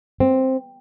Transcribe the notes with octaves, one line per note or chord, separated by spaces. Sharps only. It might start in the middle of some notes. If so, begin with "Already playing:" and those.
C4